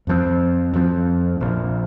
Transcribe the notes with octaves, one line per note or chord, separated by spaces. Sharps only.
F2 F3 C4
F2 F3 C4
A#1 A#2 F3